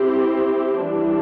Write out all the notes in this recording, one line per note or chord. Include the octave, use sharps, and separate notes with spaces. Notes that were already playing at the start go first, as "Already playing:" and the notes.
Already playing: C4 E4 G4
E3 G3 D4